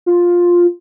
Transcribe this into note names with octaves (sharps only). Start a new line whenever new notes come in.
F4